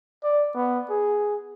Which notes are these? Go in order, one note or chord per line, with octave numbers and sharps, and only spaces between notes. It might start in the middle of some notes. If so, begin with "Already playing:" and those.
D5
B3
G#4